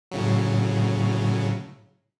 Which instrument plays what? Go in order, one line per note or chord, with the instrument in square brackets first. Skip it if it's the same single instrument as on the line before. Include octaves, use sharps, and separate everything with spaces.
[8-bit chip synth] A2 C#3 F#3